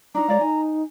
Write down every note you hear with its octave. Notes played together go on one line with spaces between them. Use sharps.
D4 D#4 A#5
G#3 C#5 D5 F5
D#4 G#5